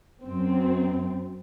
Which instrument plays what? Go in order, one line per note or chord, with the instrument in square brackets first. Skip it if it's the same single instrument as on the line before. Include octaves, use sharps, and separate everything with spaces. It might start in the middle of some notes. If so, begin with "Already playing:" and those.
[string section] F#2 C4